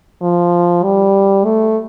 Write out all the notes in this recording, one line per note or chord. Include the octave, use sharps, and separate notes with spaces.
F3
G3
A3